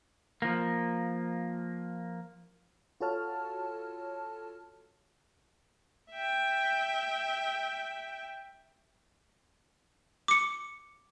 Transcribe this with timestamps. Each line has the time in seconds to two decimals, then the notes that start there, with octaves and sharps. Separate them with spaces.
0.42 F3 A#3
3.01 F4 F#4 A4 C#5 A5 F6
6.12 E5 G5
10.28 D6 C#7